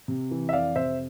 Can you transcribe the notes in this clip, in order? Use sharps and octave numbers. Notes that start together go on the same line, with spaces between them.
C3
E3
E5
F2 D5 F5
C3 C5 E5